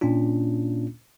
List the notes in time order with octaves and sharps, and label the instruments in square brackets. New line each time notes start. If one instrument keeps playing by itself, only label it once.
[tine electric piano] A#2 A#3 C#4 D4 F4